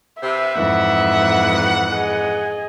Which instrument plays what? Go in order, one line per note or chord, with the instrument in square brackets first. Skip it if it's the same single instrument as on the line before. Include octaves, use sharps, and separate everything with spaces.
[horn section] C3 B4 [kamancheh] E5
[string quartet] F2 G#2 E3 [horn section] F#5
[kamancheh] G#4 D#5